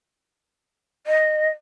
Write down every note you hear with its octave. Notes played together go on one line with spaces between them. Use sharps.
D#5